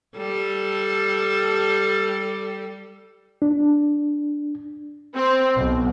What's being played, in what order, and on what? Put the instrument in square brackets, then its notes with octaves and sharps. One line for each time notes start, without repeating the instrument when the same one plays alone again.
[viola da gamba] G3 A4
[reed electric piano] D4
[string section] C4
B1